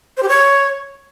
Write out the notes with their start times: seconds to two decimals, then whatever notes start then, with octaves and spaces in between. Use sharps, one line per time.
0.17 C5
0.23 G4
0.28 C#5